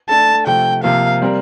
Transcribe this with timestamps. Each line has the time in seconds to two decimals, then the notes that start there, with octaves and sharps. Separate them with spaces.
0.09 A3 D4 A4 A5
0.47 C3 F3 A3 G5
0.83 C3 F3 A#3 F5
1.22 G3 C4 G4 A#4